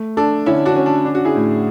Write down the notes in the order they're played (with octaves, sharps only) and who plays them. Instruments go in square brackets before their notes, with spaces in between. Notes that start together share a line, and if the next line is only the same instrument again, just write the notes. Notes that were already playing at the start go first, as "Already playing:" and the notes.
Already playing: [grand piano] A3
[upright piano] D4 [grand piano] A4
[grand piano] D3 [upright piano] C#4 E4
[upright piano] D4 F#4
[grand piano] C#4
[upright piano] D4
[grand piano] D4
[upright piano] F#4
E4 G#4
[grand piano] A2